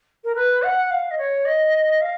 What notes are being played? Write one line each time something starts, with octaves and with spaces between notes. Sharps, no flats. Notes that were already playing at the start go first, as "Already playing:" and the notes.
A#4
B4
F#5
F5
D#5
C#5
D#5
F5